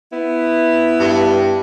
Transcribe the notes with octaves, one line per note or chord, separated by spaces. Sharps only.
B3 E4
G2